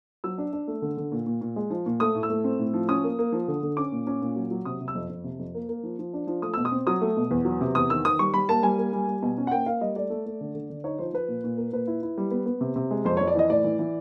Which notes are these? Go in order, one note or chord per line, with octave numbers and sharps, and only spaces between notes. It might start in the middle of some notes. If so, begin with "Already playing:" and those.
F#3 E6
D4
D4
A3
D3
D3
A#2
A#2
A#2
G#3
F3
A#2
A3 D#6
A2
E6
A3
C4
A2
F3
C#4 D#6
A#3
A#3
F3
D3
D3
C#4 D6
A#2
C#4
A#2
F#3
F#3
C3 D#6
C3
E6
F2
F2
C3
F2
A#3
A#3
F3
F3
D4
F3
A3 D#6
B2 E6
D#6
C4
F#3 D#6
A3
B2
E2
F#3
C3
E2 D#6
D#3 E6
D#3 D#6
G3 C#6
G3 B5
A#3 A5
G3 G#5
A#3
G3
G3
B2
C#4
F#5
A#3 G5
A#3 F5
G3 D#5
A3 D5
A3
A3
D3
D3
D3
D#4 C#5
F3 C5
F3 B4
A#2
A#2
A#3
A#2 B4
E4
E4
G3
B3
B3
C3
C3
G#3
F2 C5
F2 C#5
D5
E3 D#5
A2 D5
E3
E3